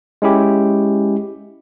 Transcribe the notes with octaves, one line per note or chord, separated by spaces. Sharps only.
G#3 C#4 E4 G4